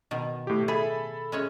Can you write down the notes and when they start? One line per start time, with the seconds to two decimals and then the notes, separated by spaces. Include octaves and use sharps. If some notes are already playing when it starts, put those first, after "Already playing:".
0.11 B2 D#3
0.47 A2 G4
0.68 G#4 A4 E5 B5
1.32 G#3 C#4 C#5